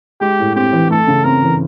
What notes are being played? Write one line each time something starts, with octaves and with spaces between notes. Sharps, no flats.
G#3 G4
A2
C4 G4
E3
A3 A4
C#3
C4 A#4
E3